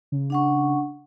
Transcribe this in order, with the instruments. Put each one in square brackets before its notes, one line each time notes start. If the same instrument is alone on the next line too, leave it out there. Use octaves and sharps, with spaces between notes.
[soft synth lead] C#3
[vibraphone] D4 F#5 C#6